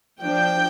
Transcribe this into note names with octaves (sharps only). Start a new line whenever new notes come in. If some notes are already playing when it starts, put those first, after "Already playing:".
F3 D4 G5